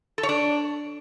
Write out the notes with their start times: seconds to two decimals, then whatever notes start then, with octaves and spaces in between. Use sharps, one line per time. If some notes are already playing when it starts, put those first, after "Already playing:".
0.18 A4
0.23 C#5
0.29 D4